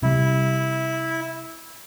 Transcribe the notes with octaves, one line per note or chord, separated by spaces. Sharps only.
C3 G3 E4